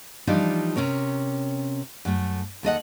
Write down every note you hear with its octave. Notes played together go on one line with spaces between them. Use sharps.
E3 F3 G3 D4 D#4 F4
C3 C#4 A#4 C#5
F#2 A3
D#2 A4 D#5 F#5